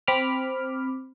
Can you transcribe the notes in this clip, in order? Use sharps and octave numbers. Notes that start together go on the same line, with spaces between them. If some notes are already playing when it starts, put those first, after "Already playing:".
C4 B5 D6 F6